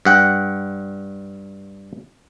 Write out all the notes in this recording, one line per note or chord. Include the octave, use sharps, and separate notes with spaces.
G2 F#5 G5